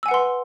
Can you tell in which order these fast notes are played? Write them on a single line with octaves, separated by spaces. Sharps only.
E6 G#5 F#5 B4 C6